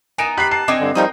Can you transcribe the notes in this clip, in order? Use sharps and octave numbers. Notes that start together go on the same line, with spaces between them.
B3 D#4 A#4 G#5 D7 E7
G4 B5 F#6 C7
A5 C7
C4 D4 D#4 D#5 G#5 D6
G2 D3
F3 G3 D#4 A#4 G5 D#6